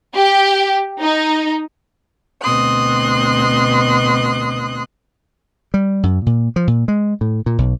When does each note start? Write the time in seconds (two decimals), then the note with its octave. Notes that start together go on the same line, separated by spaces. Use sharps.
0.15 G4
1.00 D#4
2.42 D2 B2 C4 C6 D#6 F#6
5.74 G3
6.03 F#2
6.26 A#2
6.56 F3
6.67 A#2
6.88 G#3
7.21 A2
7.46 A#2
7.58 B1